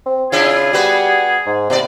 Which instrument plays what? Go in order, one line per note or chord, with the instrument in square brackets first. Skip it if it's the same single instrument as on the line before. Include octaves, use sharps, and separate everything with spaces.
[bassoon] C4
[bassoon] C#3 [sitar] D4 E4 F4 [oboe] G#4
[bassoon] G3 [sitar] B3 F#4 B4
[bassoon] G#2
[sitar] A2 B3 D5 [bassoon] C3